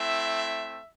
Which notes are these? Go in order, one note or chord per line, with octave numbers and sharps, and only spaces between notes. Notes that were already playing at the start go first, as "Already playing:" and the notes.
Already playing: A3 C4 E4 E5